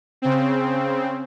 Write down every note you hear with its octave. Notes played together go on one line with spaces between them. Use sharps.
C#3 C4